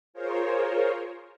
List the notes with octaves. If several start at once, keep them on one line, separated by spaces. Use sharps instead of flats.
F4 G#4 A#4 C5 C#5